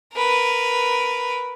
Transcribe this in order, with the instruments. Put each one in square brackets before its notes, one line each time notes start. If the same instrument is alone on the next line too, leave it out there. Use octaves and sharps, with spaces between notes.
[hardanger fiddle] A#4 B4